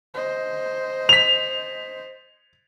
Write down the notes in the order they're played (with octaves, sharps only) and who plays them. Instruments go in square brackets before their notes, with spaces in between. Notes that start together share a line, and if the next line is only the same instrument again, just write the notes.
[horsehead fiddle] C5 D#5
[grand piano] B6 F7